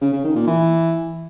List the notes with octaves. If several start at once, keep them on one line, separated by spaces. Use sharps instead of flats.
C#3
C#3
D#3
A#2
E3